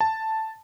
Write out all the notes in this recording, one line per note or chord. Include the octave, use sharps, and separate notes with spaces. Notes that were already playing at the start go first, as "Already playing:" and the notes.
A5